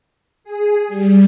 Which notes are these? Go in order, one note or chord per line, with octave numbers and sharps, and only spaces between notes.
G#4
G3